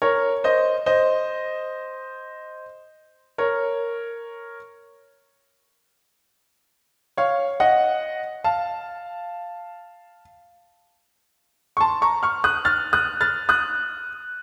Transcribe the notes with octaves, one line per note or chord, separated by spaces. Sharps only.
A#4 C#5
C5 D#5
C5 D#5
A#4 C#5
C#5 F5
D#5 F#5
F5 A5
C#6
A5 C6
A#5 C#6
C#6 F6
D#6 F#6
F6 A6
D#6 F#6
F6 A6
D#6 F#6